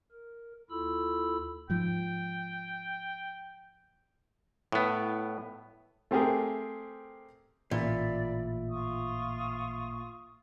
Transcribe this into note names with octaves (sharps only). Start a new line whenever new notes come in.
A#4
D#2 E4 F4 A4 B5 E6
G#2 F3 G5
A2 B3
A3 C4 G4 G#4 A#4
A1 A#2 D5 E5 B5
F4 C#6 D#6